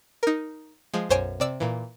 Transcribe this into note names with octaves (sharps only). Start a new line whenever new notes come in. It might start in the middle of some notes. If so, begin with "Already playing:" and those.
D#4 A#4
F3 G#3
B1 F#2 C5 C#5 G#5 D7
C3 D5 E6
A#2 E3